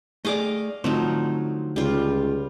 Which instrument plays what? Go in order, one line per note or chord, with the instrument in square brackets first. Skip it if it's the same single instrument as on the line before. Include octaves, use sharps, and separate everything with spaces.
[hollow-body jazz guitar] A3 G#4 D5 [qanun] D#5 F5 D6
[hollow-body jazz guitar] D3 A3 C4 [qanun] F3 F#3 D#4
[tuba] C#2 [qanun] G3 F4